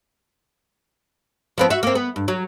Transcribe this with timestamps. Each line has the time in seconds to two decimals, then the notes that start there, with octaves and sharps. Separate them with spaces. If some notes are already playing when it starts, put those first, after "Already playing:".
1.58 F3 B3 C4
1.70 F#4 E5
1.83 A#3 C4
1.95 B3
2.16 G2
2.28 F#3